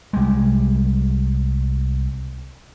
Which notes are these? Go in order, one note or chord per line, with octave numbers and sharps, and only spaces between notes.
C2 G3 G#3